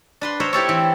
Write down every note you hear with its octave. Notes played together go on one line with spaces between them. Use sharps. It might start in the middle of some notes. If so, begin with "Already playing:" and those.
D4 B4 C6
A#4 C5 C#5 E5 B5
E4 G4 A4 C#5
E3 C4